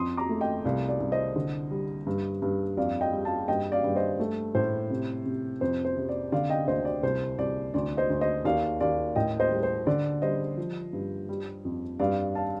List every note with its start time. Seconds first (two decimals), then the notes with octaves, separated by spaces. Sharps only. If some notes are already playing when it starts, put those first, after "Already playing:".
Already playing: F2 C6 D#6
0.17 A#5 D6
0.29 A3
0.41 D#5 G5
0.65 C2 D5 F5
0.89 D5
1.00 C2
1.12 C5 D#5
1.36 D3
1.71 G3
2.07 G2
2.42 G2
2.77 F2 D5 F5
3.01 D#5 G5
3.13 G3
3.25 F5 A5
3.48 G2 D#5 G5
3.72 D5 F5
3.84 G2
3.96 C5 D#5
4.20 A3
4.55 A2 C5
4.90 C3
5.26 C3
5.61 F2 C5
5.85 C5
5.97 C3
6.09 D5
6.32 D3 D5 F5
6.50 D#5 G5
6.68 D2 C5 D#5
6.85 D5
7.03 C2 C5
7.38 C2 D5
7.74 D2 D5
7.97 C5 D#5
8.10 D2
8.21 C5 D#5
8.45 D#2 D5 F5
8.81 D#2 D5 F5
9.16 A2 D#5 G5
9.40 C5 D#5
9.51 G3
9.63 C5
9.87 D3 D5
10.22 G3 C5 D#5
10.57 F3
10.93 G2
11.29 G3
11.65 F2
11.99 G2 D5 F5
12.35 F5 A5